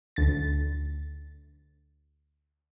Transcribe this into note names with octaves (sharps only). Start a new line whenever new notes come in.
D2 A6